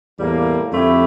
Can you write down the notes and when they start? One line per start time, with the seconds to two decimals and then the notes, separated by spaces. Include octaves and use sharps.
0.18 E2 A2 G3 A#3
0.72 F2 D3 A3 E4 G4